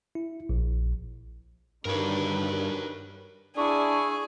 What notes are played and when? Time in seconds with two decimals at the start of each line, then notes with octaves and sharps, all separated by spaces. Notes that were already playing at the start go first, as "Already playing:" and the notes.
0.15 E4
0.49 A#1
1.85 G2 D3 D#3 G3 A#4 B4 C#5
3.57 D4 E4 G#4 C#6